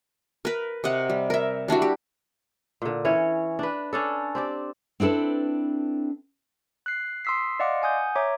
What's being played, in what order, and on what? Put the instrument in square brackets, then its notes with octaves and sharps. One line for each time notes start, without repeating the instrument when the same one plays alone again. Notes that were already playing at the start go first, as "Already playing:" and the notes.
[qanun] A#4 B4
C3 D#5 F#5
G3
A#4 E5
G3 D4 E4 F#4
G4
[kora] A#2 D3
E3 C#4 C#5
D4 B4
C#4 D4 A4
C4 G4 D5
[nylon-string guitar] C4 D4 E4 A4 B4
[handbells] F#6 C7
C6 D#6 E6 B6 C7
D5 D#5 F5 F#5 C6 D6
F#5 G#5 D#6 G6
C#5 E5 A#5 D6